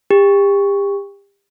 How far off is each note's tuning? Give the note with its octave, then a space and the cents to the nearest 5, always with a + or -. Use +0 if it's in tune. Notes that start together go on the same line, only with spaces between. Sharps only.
G4 +35